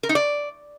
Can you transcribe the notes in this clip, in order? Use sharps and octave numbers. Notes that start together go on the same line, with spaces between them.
A#4
D#4
D5